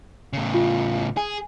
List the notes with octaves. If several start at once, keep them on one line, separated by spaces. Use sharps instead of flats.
A2 C#3
F4
G#4 G#5